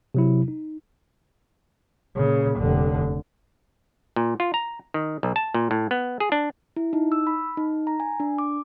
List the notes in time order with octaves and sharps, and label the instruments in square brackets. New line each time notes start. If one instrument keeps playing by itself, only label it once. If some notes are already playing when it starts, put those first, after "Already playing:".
[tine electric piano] C3 F#3 E4
D#4
[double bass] A#2 C#3
F1 D3
[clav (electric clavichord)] A#2
F4
A#5
D#3
B1
A5
A#2
A2
B3
G#4
D4
[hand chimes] E4
D#4
E6
B5
D#4
A#5
G#5
D4
D6